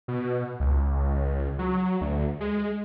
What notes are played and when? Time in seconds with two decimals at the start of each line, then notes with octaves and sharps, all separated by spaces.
0.08 B2
0.60 C#2
1.59 F#3
2.01 D2
2.40 G#3